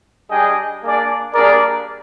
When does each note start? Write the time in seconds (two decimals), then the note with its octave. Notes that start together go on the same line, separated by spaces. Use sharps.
0.30 G3 D4 G#4 D#5 G5
0.83 A#3 D4 G#4 D5
1.34 G3 A#3 D4 G#4 A#4 D5